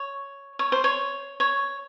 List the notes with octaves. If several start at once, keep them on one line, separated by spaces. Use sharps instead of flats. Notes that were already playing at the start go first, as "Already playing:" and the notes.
Already playing: C#5
C#5
C5
C#5
C#5